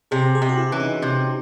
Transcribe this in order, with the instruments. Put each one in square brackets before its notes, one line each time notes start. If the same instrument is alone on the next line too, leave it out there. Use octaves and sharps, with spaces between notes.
[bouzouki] C3 [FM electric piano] G#4
[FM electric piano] G#4
[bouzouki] C3
[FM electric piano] F#4
E4
[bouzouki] E3 [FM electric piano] C#4
[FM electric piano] D#4
[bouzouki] C3 [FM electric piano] C#4